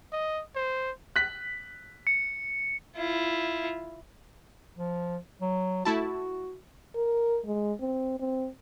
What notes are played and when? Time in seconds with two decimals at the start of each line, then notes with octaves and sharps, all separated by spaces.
0.13 D#5
0.55 C5
1.16 F#6 B6
2.07 C#7
2.96 E4 F4
4.78 F3
5.41 F#3
5.85 A3 E4 F#4 A5
6.95 A#4
7.45 G#3
7.80 C4
8.20 C4